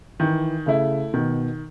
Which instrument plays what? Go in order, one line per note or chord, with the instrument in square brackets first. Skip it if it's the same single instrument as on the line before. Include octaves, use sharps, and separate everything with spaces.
[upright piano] D#3 [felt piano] E3
[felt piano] C#3 [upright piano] A3 E4
[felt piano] B2 [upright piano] D#3